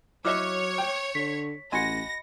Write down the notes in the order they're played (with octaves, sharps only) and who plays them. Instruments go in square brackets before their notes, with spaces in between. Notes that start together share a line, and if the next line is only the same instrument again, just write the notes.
[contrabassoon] F#3 [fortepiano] E4 D#5 E5 [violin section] C#5 [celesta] D6 F6 F#6
[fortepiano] G5
[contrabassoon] D3 [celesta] B6
[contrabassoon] A1 [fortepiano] F#4 G#5 C6 [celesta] D#5 B5 C#7 [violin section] A#6